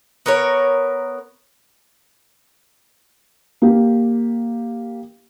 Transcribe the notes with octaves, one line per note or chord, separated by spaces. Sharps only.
B3 A#4 C#5
A#3 G4